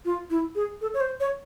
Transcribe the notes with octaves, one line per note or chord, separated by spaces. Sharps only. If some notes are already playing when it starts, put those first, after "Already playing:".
F4
E4
G#4
A4
C#5
C5
C#5